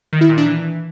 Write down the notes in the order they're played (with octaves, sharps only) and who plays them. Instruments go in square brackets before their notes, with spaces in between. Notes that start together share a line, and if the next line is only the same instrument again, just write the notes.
[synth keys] D#3
E4
A#2
D4
E3